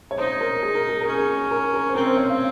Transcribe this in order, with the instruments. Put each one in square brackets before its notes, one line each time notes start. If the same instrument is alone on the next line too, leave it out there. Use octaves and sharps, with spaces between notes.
[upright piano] C#5
[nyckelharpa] D#4 [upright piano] C5
[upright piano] A#4
G#4
A#4
G#4
A#4
[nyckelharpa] C#4
[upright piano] G#4
A#4
A#4
C5
[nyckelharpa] C4 [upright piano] A#4
[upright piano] C5
C#5
F5